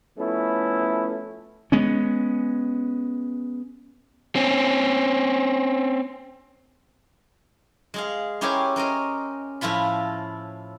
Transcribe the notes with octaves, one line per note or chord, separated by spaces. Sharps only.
F3 A3 B3 C#4 E4
G#3 B3 C#4
C4 C#4
G#3 G#4 F5
C#4 E4 G4 A#4 C5 C#5
C#4 A#4 C5 D#5
A2 F3 E4 F4 B5